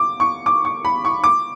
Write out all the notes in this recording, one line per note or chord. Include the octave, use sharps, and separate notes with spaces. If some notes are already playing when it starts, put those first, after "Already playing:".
Already playing: D6
C#6
D6
C#6
B5
C#6
D6